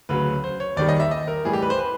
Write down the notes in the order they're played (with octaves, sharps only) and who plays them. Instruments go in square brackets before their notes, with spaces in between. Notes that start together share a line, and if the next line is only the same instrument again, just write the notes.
[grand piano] D2 C#3 F#3 B4
C5
C#5
D#2 D#3 G3 D5
D#5
E5
D#5
A#4
A2 E3 G3 G#4
G4
B4
C5
B4